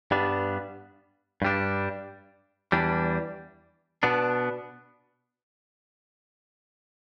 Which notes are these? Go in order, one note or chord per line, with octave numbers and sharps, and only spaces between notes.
G2 G3 B3 D4
G2 G3 D4
E2 E3 G3 D4
B2 B3 D4